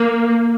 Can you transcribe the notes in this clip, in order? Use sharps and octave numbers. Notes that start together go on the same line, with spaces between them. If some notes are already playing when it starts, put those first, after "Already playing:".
Already playing: A#3